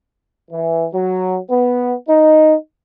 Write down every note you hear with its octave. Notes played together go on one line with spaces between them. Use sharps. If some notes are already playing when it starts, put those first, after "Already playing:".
E3
F#3
B3
D#4